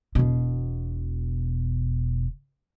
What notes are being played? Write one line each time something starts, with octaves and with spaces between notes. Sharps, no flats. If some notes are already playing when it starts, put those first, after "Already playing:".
E1 B2